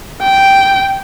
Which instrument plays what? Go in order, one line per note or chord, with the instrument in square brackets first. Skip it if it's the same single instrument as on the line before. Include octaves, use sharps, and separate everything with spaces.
[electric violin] G5